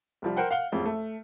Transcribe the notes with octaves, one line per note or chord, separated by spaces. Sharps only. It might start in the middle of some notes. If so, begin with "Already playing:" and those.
C2 F3 G3
A#4 C5 F#5 G5
F5 F#5 G7
A1 F2 G#3
A3